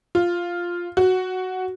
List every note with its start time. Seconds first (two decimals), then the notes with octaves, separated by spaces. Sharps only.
0.15 F4
0.97 F#4